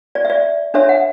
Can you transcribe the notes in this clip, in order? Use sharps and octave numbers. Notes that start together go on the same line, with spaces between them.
D5
E5
D5
D4 A4 C#5 E5
F#5